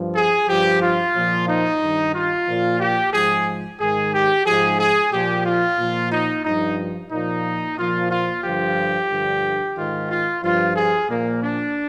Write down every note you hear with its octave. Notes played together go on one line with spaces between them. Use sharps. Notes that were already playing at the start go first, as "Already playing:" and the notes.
Already playing: G2 F3
G#4
G2 F3 G4
F4
A#2 F3
D#4
G2 D#3
F4
A#2 F3
G4
G#2 F3 G#4
G#2 D#3 G#4
G4
G#2 F3 G#4
G#4
A#2 F3 G4
F4
A#2 F3
D#4
G2 F3 D#4
A#2 F3 D#4
A#2 F3 F4
F4
G2 D3 F3 G4
G2 D3 F3
G#2 D#3 F4
F4
G2 F3 F4
G#4
A#2 F3 A#3
D4